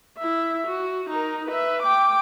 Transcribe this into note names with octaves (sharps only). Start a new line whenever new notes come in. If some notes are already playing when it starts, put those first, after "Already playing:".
E4 E5
F#4
D#4 A#4
B4 E5
G5 D6